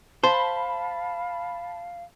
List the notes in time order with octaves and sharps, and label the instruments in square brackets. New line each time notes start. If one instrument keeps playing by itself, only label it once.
[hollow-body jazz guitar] C5 [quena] F5 [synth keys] A5 B5